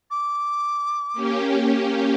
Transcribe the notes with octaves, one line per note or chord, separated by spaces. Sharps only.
D6
A#3 C#4 G4